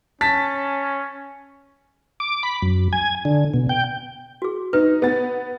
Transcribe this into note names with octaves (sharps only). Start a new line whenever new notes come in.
C#4 A5 A6 B6
D6
B5
F#2
G#5
D3
B2
G5
F#4 G#4
D#4 B4
B3 A6